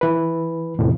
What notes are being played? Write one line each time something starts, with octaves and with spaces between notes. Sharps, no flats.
E3 B4
E2 A2 C3 F3